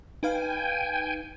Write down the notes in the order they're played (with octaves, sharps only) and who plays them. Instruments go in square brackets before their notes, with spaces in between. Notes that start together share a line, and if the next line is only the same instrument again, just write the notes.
[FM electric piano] D#4 B4 F5 [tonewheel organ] G5 G#5